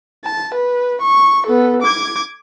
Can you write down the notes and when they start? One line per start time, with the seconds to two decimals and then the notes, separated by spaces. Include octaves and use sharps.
0.25 A5
0.54 B4
1.01 C#6
1.46 B3 A4
1.82 D6 G#6